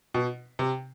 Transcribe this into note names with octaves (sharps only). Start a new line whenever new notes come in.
B2
C3